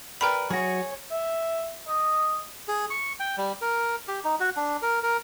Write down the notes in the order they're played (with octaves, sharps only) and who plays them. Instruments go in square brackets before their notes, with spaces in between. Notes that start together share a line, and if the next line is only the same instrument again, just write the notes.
[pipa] G3 A#4 B4 [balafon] G5 A#5 B5
[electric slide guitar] F#3 F#4 [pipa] G#4 [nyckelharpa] C#5
[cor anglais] E5
D#5
[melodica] G#4
C#6
G5
G3
A#4
G4
D#4
F#4
D4
A#4
A#4